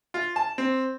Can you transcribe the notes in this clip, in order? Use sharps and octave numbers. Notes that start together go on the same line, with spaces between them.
F4
A5
C4